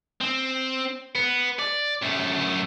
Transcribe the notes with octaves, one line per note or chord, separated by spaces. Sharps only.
C4
B3
D5
F#2 A3